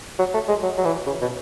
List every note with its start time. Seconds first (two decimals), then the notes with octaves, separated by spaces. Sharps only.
0.19 F#3
0.34 A3
0.48 G#3
0.63 F#3
0.78 F#3
0.85 E3
1.06 C#3
1.21 B2